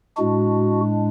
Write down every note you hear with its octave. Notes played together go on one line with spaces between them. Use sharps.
A2 G#3 D4 F#4